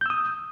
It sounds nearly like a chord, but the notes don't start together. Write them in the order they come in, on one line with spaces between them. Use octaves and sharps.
G6 E6 D#6